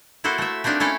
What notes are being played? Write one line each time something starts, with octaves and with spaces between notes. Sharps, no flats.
A#3 E4 F#4 A4 C5
A3 E5
A3 A#3 C4 D4 D#4
A3 C#4 E4 A4 F5